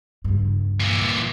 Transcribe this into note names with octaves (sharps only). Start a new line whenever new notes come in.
C#2 G2
A#2 E3